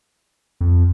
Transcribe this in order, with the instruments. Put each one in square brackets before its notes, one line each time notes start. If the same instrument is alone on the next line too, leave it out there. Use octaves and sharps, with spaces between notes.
[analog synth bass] F2